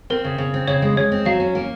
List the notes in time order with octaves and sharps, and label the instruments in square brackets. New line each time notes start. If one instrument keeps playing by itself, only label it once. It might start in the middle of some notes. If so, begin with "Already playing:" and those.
[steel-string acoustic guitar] C4 [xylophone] A#4
[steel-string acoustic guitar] C#3
C#3
C4
[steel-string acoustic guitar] C#3 [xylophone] C#5
[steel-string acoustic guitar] G#3
[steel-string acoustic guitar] G#3 [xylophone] C#5
[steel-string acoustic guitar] C4
[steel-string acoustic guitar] F#3 [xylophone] F5
[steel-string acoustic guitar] C#4
A#3